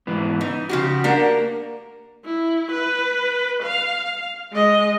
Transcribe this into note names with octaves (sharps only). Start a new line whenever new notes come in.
G#2 E3 B3
E3 D#4
C#3 F3 F#4 G4
A#3 D4 G4 A#4 F#5
E4
B4
F5
G#3 D#5